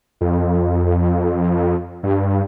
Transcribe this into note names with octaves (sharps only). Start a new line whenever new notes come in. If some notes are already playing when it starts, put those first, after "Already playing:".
F2
G2